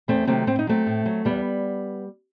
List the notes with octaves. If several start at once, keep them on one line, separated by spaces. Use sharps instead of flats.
E2 A3 C4
C3 D#3 F#3 A3 C4
A2 C4
D#4
F#3 A3 C4
A2
F#3
E2 G3 B3